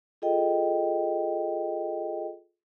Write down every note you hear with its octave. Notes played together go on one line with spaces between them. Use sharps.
F4 G#4 A4 D#5 G5